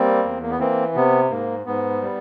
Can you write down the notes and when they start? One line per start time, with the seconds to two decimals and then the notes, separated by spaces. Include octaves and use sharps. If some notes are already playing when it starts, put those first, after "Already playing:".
Already playing: G3 A#3 C4
0.24 E2
0.42 A#3
0.50 B3
0.59 E3 A#3 C4
0.95 C3 B3
1.30 G#2 A#3
1.66 G#2 B3
2.01 G3